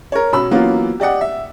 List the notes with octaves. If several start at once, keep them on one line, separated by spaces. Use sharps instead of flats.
A#4 C#5
B2 C#4 B5 E6
E3 F#3 A#3 B3 C#4 F4
G4 D5 D#5 F#5 G5
E5